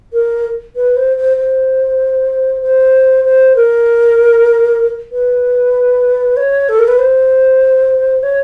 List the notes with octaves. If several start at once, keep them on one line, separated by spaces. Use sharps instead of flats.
A#4
B4
C5
C5
C5
C5
C5
A#4
B4
C#5
A4
A#4
B4
C5
C#5